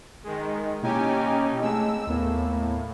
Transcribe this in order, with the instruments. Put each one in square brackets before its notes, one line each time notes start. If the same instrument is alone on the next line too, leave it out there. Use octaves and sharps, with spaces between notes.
[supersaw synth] D#3 G#3
[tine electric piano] B2 A#3 E4 [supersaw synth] C#4 G4 G#5 [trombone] D#4
[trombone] G#3 [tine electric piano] A3 C4 A5 [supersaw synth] E6
[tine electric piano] D#2 B3 [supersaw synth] A2 [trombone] A#3